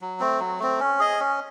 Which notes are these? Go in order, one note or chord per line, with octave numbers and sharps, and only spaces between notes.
F#3
A3 C4
F#3
A3 C4
C#4
G#4 D#5
C#4